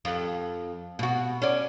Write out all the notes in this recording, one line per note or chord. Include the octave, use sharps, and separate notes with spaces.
F2
B2 F#4
C#4 D5